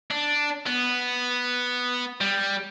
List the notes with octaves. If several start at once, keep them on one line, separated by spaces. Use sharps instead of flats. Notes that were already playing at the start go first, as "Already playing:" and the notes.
D4
B3
G3